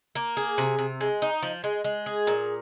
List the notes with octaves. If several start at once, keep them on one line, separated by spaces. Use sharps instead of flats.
A#3
G#4
C3
C3
G#3
D#4
F3
G#3
G#3
G#4
A#2